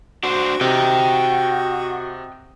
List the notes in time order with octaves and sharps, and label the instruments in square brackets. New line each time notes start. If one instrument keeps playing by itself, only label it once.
[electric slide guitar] D4 C5 [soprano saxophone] F#4
[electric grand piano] C3 [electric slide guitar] D#5 G5